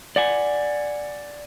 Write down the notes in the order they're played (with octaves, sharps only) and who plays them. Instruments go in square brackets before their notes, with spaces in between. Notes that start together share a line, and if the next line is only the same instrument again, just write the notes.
[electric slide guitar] D5 F#5 G#5